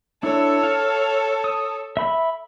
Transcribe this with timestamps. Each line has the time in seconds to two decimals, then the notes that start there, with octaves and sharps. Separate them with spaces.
0.23 D4 E4 A4 C#5
0.63 F5
1.44 D#6
1.97 E5 B5